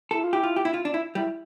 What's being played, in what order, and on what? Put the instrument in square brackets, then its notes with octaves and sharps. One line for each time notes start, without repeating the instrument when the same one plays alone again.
[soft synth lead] E4 [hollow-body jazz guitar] A4
[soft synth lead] F4
[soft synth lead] E4 [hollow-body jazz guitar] G4
[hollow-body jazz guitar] F4
G4
E4
F4
D4
E4
[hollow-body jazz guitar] G3 [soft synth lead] E4